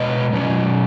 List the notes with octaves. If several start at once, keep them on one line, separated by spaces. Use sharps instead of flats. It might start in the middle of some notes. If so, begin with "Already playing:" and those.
Already playing: B2 G#3 B4 D#5
B2 F#3 C#4